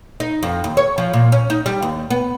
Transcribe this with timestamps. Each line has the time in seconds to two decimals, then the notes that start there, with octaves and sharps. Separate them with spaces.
0.20 D#4
0.43 F2
0.64 D#2
0.77 C#5
0.98 F3
1.13 A#2
1.32 C#4
1.50 D#4
1.66 G3
1.82 D#2
2.10 B3